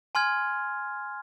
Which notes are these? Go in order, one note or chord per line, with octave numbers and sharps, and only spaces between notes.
G#5 C6 F6 G#6